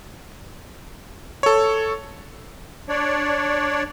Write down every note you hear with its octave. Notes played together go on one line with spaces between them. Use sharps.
A4 C#5
D4 C#5 D5